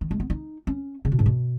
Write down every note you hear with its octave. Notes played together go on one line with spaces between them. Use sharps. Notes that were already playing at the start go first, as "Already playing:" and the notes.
D#3
G#3
B3
D#4
C#4
C#3
B2
G#2
B2